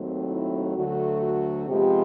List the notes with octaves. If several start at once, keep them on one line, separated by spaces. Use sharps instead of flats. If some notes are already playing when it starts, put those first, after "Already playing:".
Already playing: D#2 D#3 F#3 A3 C4
E4
D2 D3 F#3 A3 F#4
F#4
C3 F3 G#3 B3 G4